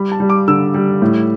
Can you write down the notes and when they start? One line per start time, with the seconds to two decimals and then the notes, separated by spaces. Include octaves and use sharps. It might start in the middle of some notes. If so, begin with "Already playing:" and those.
Already playing: G3 B5
0.12 A5
0.20 G3
0.30 D6
0.48 D3 E6
0.74 G3
1.02 A2